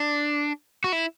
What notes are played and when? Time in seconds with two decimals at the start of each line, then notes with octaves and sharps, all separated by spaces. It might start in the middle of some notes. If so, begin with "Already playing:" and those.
Already playing: D4
0.84 F#4
0.92 E4